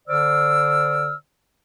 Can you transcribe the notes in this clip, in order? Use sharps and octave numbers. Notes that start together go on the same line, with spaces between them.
D3 C5 D5 E6 F6